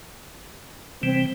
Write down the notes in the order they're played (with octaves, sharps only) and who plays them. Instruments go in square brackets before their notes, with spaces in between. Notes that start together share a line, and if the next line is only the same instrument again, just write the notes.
[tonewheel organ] C3 E3 G3 [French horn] C4